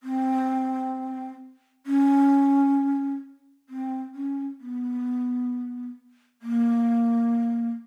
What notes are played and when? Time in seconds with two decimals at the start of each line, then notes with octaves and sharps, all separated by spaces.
0.03 C4
1.86 C#4
3.69 C4
4.14 C#4
4.60 B3
6.42 A#3